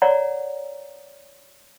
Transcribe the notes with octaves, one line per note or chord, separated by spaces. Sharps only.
C#5 D5 F#5 A#5